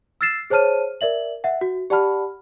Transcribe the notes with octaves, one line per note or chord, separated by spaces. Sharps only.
E6 F6 A6 C7 E7
G#4 C5 C#5 A5 F6 D#7
A#4 D5 E5 F#7
E5 F#5
F#4
G4 D5 F#5 A5 B5 F6